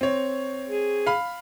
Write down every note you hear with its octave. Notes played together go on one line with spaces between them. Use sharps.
C4 C#5
G#4
F5 B5